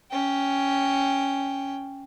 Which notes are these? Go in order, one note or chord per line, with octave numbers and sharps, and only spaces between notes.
C#4 G5